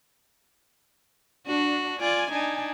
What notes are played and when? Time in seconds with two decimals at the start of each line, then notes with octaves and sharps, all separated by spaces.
1.48 D4 F#4
2.00 F4 D5 G#5
2.32 D4 D#4